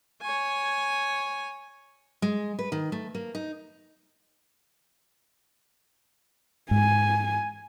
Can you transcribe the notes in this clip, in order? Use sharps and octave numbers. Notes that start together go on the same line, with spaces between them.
C#5 G#5
G#3
B4
D#3
A3
A#3
D#4
G#2 G#5